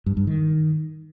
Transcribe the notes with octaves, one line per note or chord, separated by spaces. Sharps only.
G2
G2
D#3